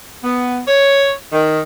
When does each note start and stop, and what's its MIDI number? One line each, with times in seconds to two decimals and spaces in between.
0.24 0.62 59
0.67 1.10 73
1.32 1.62 51